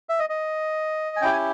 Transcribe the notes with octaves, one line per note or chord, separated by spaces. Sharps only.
E5
D#5
D#5
G#5
C#4 E4 G4 G5
G#5